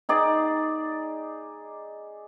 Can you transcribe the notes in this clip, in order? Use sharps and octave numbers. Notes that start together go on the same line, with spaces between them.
D#4 G#4 D5